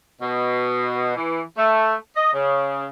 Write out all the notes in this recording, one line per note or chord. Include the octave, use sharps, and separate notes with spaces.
B2
E3
A3
D#5
C#3